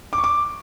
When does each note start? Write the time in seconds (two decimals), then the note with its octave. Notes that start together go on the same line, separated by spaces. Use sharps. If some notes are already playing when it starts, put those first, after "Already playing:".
0.13 D6
0.18 C#6
0.24 D6